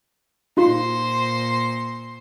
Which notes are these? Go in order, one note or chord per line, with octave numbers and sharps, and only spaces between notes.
A#2 D#4 F4 C5 C6